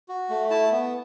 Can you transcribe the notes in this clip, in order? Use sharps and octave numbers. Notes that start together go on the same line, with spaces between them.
F#4
A3
E4 A5
B3